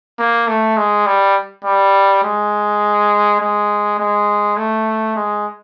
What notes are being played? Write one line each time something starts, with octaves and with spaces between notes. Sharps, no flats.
A#3
A3
G#3
G3
G3
G#3
G#3
G#3
A3
G#3